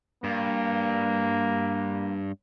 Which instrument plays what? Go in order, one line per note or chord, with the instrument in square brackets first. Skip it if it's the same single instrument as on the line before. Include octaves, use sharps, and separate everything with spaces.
[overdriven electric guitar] G2 [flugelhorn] A#3